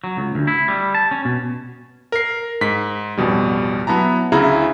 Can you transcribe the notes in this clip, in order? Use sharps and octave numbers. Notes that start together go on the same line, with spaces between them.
F#3
C#2
D2
E4
G3
A5
C#4
B2
A#4 C7
G#2 B6
A1 F2 B2 G3
F#3 B3 E4 A5 A#5
D2 C#3 C#4 E4 G#4 A#5